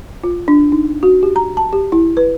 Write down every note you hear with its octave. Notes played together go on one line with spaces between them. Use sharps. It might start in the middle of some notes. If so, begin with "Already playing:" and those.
F4
D4
D#4
F#4
G4
A#5
A5
G4
E4
B4